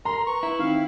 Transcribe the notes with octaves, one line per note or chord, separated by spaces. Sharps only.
A#4 A#5 C6
B4 C#6
E4
D#3 C4 F5